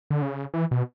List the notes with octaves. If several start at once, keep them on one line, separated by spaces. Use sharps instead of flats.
D3
C#3
E3
B2